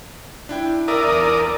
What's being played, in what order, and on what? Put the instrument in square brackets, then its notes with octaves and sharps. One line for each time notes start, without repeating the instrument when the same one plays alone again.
[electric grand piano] D4 E4 G5
[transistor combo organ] A#4 D5 D#6 [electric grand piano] E5 E6
[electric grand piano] E2